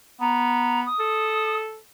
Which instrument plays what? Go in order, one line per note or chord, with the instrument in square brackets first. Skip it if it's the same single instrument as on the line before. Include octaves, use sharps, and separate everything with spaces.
[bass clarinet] B3 [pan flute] A#5
[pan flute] D#6
[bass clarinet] A4